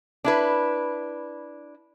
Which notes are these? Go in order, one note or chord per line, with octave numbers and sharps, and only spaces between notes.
D4 E4 B4